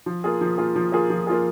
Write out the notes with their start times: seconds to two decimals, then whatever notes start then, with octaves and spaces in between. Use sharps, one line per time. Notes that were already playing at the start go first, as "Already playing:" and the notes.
0.06 F3
0.24 A#3 F4 G#4
0.41 F3
0.58 A#3 F4 G#4
0.76 F3
0.92 A#3 F4 G#4
1.10 F3
1.27 A#3 F4 G#4